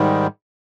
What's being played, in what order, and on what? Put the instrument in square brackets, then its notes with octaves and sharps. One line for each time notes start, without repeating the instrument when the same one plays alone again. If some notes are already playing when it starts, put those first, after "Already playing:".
Already playing: [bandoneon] G#2 D#3 G3